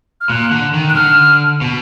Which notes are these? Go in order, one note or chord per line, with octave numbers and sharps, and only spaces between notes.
F6
A#2 F#6
D3
D#3
F#6
D3 F6
B2